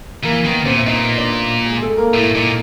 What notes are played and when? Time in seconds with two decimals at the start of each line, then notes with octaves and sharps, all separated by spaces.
0.23 E3 A#3 A#4
0.44 D#3 B3 B4
0.65 A#2 C4 C5
0.77 E5
0.86 A#2 D#4 D#5
1.18 D4 D5
1.66 G#3 G#4
1.82 A3 A4
1.97 A#3 A#4
2.13 A2 E4
2.34 A#2 D#4